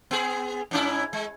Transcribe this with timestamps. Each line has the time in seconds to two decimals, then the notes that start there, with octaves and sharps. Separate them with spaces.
0.11 B3 G#4
0.71 G#2 C#4 E4
1.13 G#3